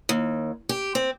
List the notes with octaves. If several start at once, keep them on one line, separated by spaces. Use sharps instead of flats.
D#2
G4
C4